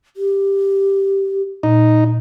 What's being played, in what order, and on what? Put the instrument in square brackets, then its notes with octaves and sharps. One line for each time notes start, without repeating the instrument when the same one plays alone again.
[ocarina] G4
[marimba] A#2 [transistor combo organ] D#4